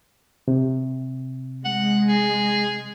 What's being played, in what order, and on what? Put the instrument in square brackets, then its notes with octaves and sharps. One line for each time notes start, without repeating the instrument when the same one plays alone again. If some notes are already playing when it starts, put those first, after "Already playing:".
[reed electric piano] C3
[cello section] G#3 [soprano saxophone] F#5
[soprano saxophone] G#4